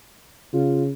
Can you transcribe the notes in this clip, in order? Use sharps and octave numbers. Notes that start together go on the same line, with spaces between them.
C#3 F4